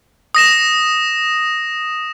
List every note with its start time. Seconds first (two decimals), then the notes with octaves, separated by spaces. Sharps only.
0.35 D#6 A#6 E7